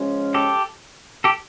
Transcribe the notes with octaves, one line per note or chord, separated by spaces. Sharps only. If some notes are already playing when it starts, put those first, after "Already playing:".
Already playing: C#3 F3 G#3 C#4
G4 A4
G4 A4